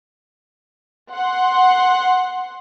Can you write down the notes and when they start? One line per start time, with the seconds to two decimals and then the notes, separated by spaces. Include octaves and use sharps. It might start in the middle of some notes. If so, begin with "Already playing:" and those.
1.12 F#5 C6